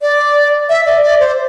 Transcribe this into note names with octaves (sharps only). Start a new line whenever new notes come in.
D5
E5
D5
D5
C5